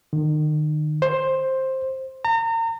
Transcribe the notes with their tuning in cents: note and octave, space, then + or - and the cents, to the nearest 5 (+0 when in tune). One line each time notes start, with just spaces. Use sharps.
D#3 -35
C5 +10
A#5 -35